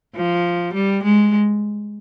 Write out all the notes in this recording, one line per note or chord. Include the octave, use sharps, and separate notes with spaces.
F3
G3
G#3